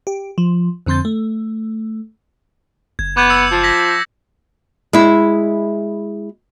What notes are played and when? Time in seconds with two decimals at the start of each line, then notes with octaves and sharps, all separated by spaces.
0.07 G4
0.38 F3
0.86 F2 D3 C4 C6 G6 A6
1.05 A3
2.99 F#1 G#6
3.17 B3 D6 G6 G#6
3.30 E6 C#7
3.51 F3
3.63 G#6 A#6 B6
4.93 G#3 E4